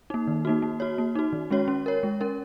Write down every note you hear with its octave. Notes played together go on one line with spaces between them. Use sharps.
A#3 D#4
D#3
A#3 D#4 F#4
A#3
F#4 C#5
A#3
D#4 F#4
D#3
G#3 C#4 F#4 C#5
C#4
A#4 C#5
G#3
C#4 A#4